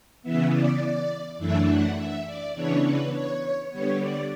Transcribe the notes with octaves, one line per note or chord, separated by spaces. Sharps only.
C#3 E3 B3 E5
D5
F#2 E3 A3 D4 E5
F#5
E5
D5
C#3 E3 B3 D4 C#5
B4
C#5
D3 G3 B3 C#5
D5